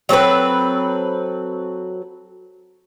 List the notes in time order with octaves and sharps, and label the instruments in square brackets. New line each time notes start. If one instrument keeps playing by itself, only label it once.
[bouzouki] F#3 C4 A4 B4